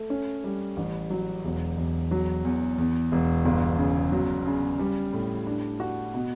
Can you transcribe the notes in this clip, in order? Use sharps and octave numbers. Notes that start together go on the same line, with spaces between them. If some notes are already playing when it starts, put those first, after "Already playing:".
Already playing: A3
C#4
G3
A1
F#3
E1
E1
F#3
E2
E2
E1
G1
C#3
F#3
C#3
G3
A2
D4
F#4
B2